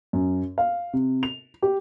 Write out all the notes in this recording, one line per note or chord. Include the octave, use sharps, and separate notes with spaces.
F#2
F5
C3
F7
G4